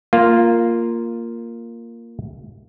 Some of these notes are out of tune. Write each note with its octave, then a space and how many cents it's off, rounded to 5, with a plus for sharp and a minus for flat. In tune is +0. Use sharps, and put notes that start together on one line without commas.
A#3 -5 F4 +0